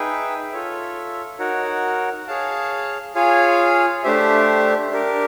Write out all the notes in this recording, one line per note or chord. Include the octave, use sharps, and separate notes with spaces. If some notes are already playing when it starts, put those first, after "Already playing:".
Already playing: D#4 G#4 B4 E5 G5
F4 A4 C#5 E5
D#4 F#4 A#4 C#5 F#5
G#4 C#5 F5 A5
F4 G#4 C#5 F5 G#5
A3 D4 G4 C5 E5
D4 G4 A#4